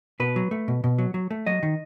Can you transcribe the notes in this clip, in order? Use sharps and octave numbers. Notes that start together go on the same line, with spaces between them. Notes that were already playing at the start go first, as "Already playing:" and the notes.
B2 B4
F#3
A3
B2
B2
F#3
F#3
A3
F#3 D#5
D#3